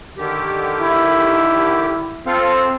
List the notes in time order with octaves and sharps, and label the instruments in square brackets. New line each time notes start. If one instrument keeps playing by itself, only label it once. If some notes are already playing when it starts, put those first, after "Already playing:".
[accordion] D3 D#3 G4
[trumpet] E4
[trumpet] C4 [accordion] F4 A4 F5